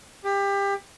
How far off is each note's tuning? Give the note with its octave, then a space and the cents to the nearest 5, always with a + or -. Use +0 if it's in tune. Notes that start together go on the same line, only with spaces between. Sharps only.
G4 +25